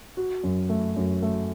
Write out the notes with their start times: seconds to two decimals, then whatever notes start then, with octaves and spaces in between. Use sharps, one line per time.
0.17 F#4
0.43 F#2
0.69 A3
0.96 F#2
1.22 A3